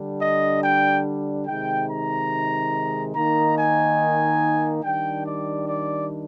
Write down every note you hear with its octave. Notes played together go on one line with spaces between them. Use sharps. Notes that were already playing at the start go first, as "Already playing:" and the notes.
Already playing: D3 G3 D4
D#5
G5
C3 D#3 G#3 D#4 G5
A#5
D#3 A#3 D#4 A#5
G#5
D#3 G3 D4 G5
D5
D5